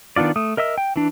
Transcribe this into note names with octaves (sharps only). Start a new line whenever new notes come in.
D#3 B3 D4 F4 D5
A3 D#6
A#4 D#5 E5 E6
G5
E3 D4